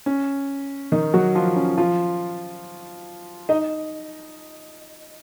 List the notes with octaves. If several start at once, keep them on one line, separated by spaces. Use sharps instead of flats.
C#4
D#3 D#4
F#3 F#4
F3 F4
C#4
F3 F4
D#4 D#5